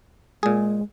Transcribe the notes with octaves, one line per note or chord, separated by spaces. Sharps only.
A#2 G#3 G#4